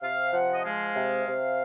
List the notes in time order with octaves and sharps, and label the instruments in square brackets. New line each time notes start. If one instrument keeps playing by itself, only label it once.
[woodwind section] C3 F5
F3 F#5
D#5
G#3 F5
C3
C3